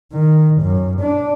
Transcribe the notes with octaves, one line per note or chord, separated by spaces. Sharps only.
D#3
F#2
D4